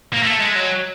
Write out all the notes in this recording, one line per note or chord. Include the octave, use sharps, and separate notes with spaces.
A#3
A3
G#3
F#3